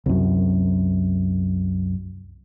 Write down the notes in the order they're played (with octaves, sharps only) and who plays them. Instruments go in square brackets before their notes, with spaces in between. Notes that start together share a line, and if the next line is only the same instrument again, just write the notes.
[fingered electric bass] C2 F#2